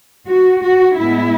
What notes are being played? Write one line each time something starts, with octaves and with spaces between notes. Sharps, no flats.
F#4
F#4
A2 G#3 B3 E4